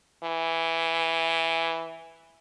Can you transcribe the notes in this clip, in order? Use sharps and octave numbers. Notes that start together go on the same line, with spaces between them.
E3